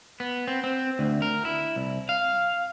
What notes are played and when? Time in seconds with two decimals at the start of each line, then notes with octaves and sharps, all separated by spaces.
0.20 B3
0.48 C4
0.64 C4
0.99 D2
1.22 A#4
1.45 E4
1.76 C2
2.09 F5